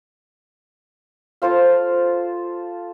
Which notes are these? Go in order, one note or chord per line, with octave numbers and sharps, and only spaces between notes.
F4 A4 C5 F5